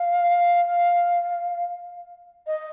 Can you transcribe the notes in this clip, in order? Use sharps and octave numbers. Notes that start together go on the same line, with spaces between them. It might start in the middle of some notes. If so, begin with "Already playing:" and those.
Already playing: F5
D#5